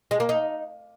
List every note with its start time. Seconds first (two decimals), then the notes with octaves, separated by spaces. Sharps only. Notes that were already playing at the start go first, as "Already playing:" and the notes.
0.11 G#3
0.20 A#3
0.29 D#4